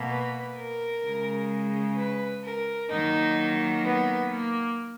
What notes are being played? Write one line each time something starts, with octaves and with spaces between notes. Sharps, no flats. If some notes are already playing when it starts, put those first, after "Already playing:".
Already playing: B2 A#3
B4
A#4
C#3 G#3
B4
A#4
D#3 F#3 A#3 D#4
B3
A#3